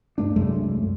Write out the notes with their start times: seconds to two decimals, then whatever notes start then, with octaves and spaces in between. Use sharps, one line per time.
0.18 G2 A3 D4
0.36 C2 F#2 G#3 A3